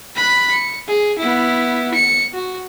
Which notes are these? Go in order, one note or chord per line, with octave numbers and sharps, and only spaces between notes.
B5 F#6
C#7
G#4
B3 E4
C#7
F#4